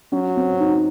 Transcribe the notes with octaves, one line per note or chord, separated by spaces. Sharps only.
F#3 C#4
C4
D#4